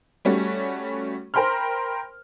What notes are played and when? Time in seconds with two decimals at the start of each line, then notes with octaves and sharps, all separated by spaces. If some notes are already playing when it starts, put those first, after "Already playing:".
0.25 G3 A3 C#4 F#4
1.34 A#4 C5 G5 B5 C6 F6